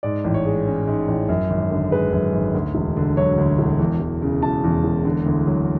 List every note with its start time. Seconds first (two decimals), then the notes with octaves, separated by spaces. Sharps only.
0.03 G#2 D5
0.24 A1
0.34 C#5
0.45 G#3
0.67 C#4
0.87 G#2
1.08 A1
1.29 F#2
1.50 G#1
1.71 D3
1.91 G#3 B4
2.13 F#2
2.33 G#1
2.55 D2
2.75 E1
2.97 D3
3.17 F#3 C#5
3.38 D2
3.59 E1
3.79 E2
4.00 E1
4.22 C#3
4.42 E1 A5
4.64 E2
4.84 E1
5.05 D3
5.26 D2
5.47 F#3